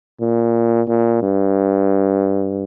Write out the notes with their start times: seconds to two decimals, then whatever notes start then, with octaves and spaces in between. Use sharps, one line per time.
0.20 A#2
0.88 A#2
1.22 G2